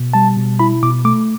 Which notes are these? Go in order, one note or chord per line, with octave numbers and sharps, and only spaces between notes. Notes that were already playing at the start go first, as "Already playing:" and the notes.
Already playing: B2
G3 A5
B2
E4 B5
B2 D6
A3 D6